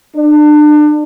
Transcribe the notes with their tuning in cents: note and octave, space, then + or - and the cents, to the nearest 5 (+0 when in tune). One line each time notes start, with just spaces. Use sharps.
D4 +30